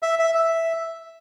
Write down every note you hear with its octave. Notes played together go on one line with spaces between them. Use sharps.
E5
E5
E5